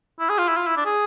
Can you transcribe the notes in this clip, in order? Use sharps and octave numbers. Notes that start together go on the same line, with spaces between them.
E4
G#4
F4
E4
F4
E4
D4
G#4